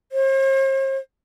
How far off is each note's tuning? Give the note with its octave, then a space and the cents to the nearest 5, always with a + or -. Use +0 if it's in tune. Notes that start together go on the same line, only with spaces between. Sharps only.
C5 +45